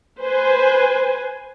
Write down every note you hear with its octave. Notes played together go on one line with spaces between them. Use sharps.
B4 C5 G#5